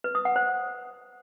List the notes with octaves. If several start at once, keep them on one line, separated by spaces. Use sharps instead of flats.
B4
D#6
F#5
C5